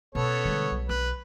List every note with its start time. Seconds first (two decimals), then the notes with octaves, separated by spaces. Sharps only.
0.15 B2 B3 C#4 A4 C#5
0.45 D3 G3 G#3
0.72 B1
0.89 C4 B4